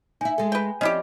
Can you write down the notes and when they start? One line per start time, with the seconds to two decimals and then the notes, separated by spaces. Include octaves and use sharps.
0.21 D#4 E4 G#5
0.38 G#3 A4
0.52 B4 G5
0.81 F3 C4 C#4 E4 G4 D5 D#5